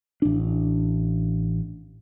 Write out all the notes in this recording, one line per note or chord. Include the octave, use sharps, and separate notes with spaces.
A1 D4